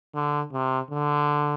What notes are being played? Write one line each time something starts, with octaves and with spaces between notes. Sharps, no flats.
D3
C3
D3